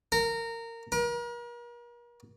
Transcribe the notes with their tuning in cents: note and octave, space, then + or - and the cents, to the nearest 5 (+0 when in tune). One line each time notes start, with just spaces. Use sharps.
A#4 -20
A#4 +40